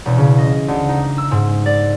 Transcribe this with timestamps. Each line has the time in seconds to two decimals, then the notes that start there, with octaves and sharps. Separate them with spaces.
0.05 E1
0.18 C#3
0.38 D#5
0.68 D2
0.89 D#4
1.18 E6
1.31 G#2
1.66 D5